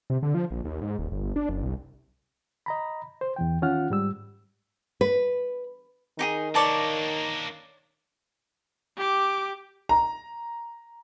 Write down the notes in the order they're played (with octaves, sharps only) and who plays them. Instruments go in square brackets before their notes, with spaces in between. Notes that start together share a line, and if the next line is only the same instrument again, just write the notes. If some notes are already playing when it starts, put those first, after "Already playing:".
[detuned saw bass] C3
D3
F3
A#1
D#2
G#2
D#1
G1
G1
D4
F#1
C2
[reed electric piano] D#5 A#5 B5
C5
E2 E3 G5
D#3 C#4 F4 F#5 F6
G#2 G3 E6
[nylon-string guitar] B4
[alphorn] D#3 [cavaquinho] D#4 G4 G#4
[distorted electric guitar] A#3 D4 [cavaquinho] C#5 D5 A5
[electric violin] G4 D6
[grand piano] A#5